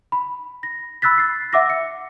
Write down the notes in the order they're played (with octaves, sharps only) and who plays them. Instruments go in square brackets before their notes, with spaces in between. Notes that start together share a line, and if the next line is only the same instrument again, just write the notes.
[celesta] B5
A#6
B5 E6 F#6 A6 B6
A6 C7
E5 F#5 D6 E6 A#6
C#7